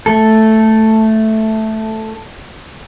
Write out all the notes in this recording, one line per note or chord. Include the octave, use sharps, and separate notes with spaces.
A3 A4